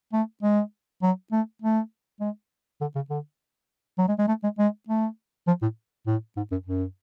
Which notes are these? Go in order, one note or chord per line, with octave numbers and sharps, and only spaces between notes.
A3
G#3
F#3
A3
A3
G#3
D3
C#3
D3
F#3
G#3
G#3
A3
G#3
G#3
A3
F3
A2
A2
G#2
F#2
F#2